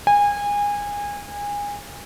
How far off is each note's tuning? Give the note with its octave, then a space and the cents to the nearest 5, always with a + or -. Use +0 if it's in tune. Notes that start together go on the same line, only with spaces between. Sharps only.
G#5 -25